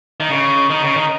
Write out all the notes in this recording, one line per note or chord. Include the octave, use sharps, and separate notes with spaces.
D#3
C#3
D#3
C#3
D#3